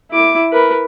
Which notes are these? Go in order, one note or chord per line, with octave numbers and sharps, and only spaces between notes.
E4 D6
A#4 B4